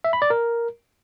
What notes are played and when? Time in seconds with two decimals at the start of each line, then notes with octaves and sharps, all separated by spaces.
0.04 E5
0.13 B5
0.22 D5
0.30 A#4